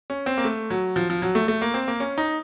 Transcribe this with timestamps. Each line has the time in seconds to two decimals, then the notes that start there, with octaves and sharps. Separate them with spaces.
0.10 C#4
0.26 C4
0.38 A#3
0.45 A3
0.70 F#3
0.96 F3
1.10 F3
1.22 F#3
1.35 A3
1.48 A3
1.62 A#3
1.74 C4
1.88 A#3
2.00 C#4
2.18 D#4